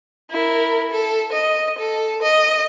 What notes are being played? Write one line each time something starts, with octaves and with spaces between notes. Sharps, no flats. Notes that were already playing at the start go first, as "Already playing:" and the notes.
E4 A#4
A4
D#5
A4
D#5